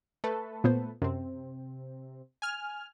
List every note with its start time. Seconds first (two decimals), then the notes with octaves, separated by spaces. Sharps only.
0.24 A3 A4 B4
0.64 A#2 B3 C5
1.02 F#2 C3 C4
2.42 G#5 F6